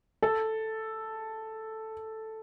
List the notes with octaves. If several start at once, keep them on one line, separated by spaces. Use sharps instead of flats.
A4